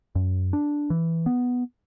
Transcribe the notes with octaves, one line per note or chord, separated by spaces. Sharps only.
F#2
D4
E3
B3